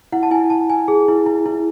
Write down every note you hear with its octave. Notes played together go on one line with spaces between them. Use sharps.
E4 F#5
A5
E4 G#5
E4 A5
E4 G#5
G#4
E4
E4
E4